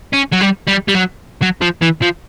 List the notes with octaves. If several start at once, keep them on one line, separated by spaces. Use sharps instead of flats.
C#4
F#3
G3
G3
G3
F#3
F#3
F3
E3
F3